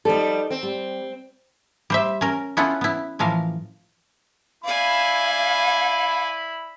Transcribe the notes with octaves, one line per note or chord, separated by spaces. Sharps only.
F3 G3 D#4 A4
C4
G3
G3 C5 E5
C#4 A#4
B3 C#4 E4 F4 A4 F#5
B3 E4
A2 E3 F3 A#4 F5
E4 D5 F5 G#5 B5